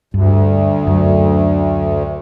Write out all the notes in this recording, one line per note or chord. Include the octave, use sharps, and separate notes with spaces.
D2 G2
F#2